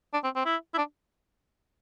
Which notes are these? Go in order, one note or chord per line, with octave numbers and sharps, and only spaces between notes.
D4
C4
C4
E4
E4
D4